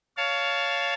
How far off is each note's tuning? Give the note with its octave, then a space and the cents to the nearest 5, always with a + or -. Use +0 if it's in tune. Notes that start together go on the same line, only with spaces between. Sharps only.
C#5 +20 F5 +0 A5 +0